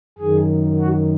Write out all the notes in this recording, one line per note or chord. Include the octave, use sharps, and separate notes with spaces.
F#2 D#3 G#4
F#4